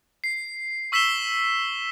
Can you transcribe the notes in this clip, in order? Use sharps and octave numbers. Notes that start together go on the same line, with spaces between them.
C7
C#6 E6 B6 C7 E7 G7